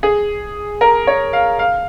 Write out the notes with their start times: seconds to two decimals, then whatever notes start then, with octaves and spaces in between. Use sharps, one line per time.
0.03 G#4
0.81 A#4
1.07 C#5
1.33 F5
1.59 F5